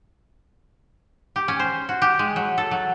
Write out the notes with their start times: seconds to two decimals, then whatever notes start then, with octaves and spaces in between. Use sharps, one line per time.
1.36 G4
1.48 C#4
1.59 C5
1.89 F#4
2.02 G4
2.19 G#3
2.36 F#3
2.58 A4
2.71 F#3